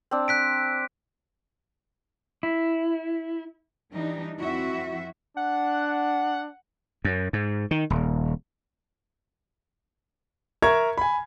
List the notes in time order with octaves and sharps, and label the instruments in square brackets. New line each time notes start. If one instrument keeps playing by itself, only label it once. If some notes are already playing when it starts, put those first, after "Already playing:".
[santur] C4 D4
[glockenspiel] F#6 B6 D7
[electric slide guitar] E4
[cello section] E3 G3 D4 D#4
F2 C4 E4 F#4 E5
[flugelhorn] D4 [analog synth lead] F#5
[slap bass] F#2
G#2
D#3
D#1
[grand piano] A#4 E5 A#5 C#6 G#6
G#5 B5